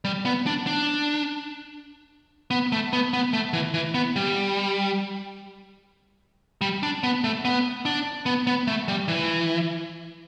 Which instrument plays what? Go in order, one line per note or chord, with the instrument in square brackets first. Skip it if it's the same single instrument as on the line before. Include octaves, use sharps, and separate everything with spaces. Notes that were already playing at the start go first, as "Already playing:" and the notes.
[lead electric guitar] G3
B3
D4
D4
B3
A3
B3
B3
A3
E3
E3
B3
G3
G3
D4
B3
A3
B3
D4
B3
B3
A3
G3
E3